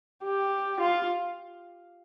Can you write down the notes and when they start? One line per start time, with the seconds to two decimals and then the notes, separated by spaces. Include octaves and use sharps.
0.23 G4
0.80 F4